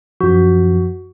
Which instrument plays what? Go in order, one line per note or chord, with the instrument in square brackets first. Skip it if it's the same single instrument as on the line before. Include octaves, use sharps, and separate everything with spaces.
[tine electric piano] F#2 F3 [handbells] F#4